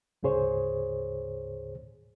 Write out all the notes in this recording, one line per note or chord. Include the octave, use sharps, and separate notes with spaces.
D2 G#2 C#3 G#4 C5 C#5